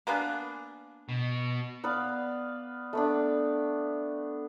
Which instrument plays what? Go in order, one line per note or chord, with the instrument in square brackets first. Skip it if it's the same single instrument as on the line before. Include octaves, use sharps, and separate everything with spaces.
[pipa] A#3 B3 D4 [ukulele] A#4 F5 G#5
[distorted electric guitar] B2
[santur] B3 B4 D5 F5
A3 B3 D4